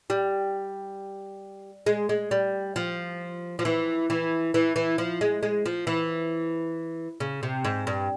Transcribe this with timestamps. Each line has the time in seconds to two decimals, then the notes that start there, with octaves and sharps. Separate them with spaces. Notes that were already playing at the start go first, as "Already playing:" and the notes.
0.10 G3
1.86 G#3
2.09 G#3
2.31 G3
2.76 F3
3.59 F3
3.65 E3
4.10 E3
4.54 E3
4.76 E3
4.98 F3
5.21 G#3
5.43 G#3
5.66 F3
5.87 E3
7.20 C#3
7.43 C3
7.64 G#2
7.87 G2